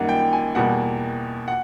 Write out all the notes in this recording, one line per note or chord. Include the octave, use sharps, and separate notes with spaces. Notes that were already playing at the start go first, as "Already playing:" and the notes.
Already playing: F#2 D#3 G3 A#3 F#5
G5
G#5
E2 B2 G3 A#3 F#5
F#5